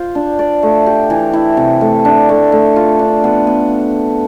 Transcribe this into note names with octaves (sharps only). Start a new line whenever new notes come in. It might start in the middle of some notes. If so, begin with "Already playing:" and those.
Already playing: F4 C5
D4
D5
A3
G4
E3
E4
C3
A3
D4
A3
A3
F4
D4
B3
B3